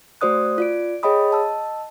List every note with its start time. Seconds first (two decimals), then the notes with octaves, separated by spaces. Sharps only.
0.21 A3 F#4 C5 D5 D#6 F#6
0.58 F4 D5 D7
1.03 G#4 C#5 D#5 G5 B5 D#6
1.31 D#5 A5 E6